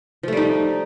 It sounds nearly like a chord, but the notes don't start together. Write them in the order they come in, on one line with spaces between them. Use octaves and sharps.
F3 A3 G3 D#4